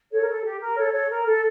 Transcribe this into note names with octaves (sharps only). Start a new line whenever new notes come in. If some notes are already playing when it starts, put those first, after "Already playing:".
A4 C#5
A#4
A4
G4
A#4
A4 C#5
A4 C#5
A#4
A4